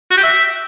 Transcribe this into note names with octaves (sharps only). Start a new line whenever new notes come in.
F#4
G4
E5